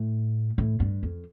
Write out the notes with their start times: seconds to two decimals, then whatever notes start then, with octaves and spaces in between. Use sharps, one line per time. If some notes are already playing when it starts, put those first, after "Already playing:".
Already playing: A2
0.58 A2
0.80 G2
1.03 F2